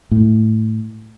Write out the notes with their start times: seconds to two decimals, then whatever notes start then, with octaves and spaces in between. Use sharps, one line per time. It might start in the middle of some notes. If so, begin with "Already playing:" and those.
0.11 A2